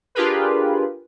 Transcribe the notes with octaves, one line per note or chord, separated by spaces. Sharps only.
D4 F4 G4 G#4 A#4 B4